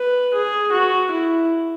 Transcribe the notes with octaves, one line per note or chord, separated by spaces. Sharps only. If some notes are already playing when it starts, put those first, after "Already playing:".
Already playing: B4
G#4
F#4
E4